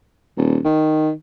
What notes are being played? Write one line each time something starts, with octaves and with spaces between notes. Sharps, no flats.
D#1
D#3